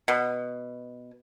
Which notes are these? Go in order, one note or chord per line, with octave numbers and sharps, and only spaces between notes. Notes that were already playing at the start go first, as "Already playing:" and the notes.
B2